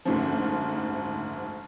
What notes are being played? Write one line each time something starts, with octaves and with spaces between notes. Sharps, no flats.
F#1 D2 G#2 C#3 F3